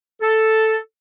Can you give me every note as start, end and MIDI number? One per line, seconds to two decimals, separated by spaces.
0.21 0.76 69